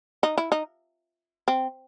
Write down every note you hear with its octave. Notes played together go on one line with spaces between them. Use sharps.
D#4
E4
D#4
C4